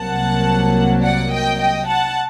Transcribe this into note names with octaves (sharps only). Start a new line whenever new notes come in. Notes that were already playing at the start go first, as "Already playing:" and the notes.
Already playing: C2 C3 F#3 A#3 F#5 A5
D5 F#5
D#5 G5
D#5 G5
F#5 A5